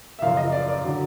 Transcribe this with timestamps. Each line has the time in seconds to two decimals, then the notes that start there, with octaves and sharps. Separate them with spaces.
0.19 E5
0.22 F#2 C#3 F3 F5
0.37 D#5
0.52 D5
0.68 D5
0.84 D3 F#3